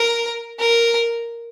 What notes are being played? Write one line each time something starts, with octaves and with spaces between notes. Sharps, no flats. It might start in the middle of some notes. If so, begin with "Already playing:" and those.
Already playing: A#4
A#4